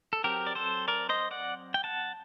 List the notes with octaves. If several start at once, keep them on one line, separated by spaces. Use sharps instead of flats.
A4
F#3 C4 G4 A#4
D5
A4 C5
A#4 D5
C5 D#5
D5 F#5
G5
F#5 A5